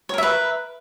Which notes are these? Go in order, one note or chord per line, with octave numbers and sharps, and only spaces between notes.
A#4 B4 C#5 E5